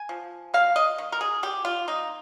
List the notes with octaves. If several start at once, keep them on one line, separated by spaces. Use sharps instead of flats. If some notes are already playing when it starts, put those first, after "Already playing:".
Already playing: G#5
F3
A#3 F5
D#5
D#3
A#4
G#4
D#3 G4
F4
A#3 D#4